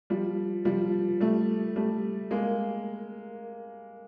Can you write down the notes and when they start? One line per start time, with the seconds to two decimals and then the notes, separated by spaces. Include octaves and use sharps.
0.10 F3 G3
0.65 F3 G3
1.20 G3 A3
1.76 G3 A3
2.31 G#3 A#3